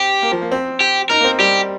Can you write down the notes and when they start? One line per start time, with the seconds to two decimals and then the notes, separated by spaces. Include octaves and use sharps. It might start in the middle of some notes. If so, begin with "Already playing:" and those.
Already playing: C4 G4
0.22 A#3
0.31 F3
0.42 A#3
0.51 C4
0.80 G4
1.10 D#4 A#4
1.20 A#3
1.24 C4
1.39 G3 G4